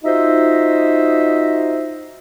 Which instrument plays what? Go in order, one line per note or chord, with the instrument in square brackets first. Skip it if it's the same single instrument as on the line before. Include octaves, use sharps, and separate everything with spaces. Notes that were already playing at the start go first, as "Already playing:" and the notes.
[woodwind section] D#4 F4 F#4 C5 D#5 E5